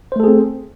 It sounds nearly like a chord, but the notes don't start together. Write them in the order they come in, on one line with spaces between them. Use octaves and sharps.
C5 A3 A4 G#4 C4